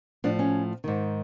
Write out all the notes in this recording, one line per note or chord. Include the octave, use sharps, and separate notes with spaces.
A2 F3 D4
C#4
G#2 D#3